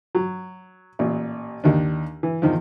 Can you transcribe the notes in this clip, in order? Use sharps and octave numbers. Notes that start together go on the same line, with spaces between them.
F#3
A1 A#2
D#2 D#3 D4
E3
E2 D#3 F3